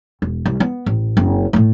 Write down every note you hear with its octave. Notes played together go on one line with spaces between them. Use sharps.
E1
C2
B3
A1
F#1 C4
A2 A3